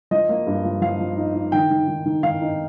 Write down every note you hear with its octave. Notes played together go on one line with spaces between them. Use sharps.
F3 D#5
A#3
G2
F3
F3 F5
F3
D#4
D#4
D#3 G5
D#3
D#3
D#3
D#3 F5
D#4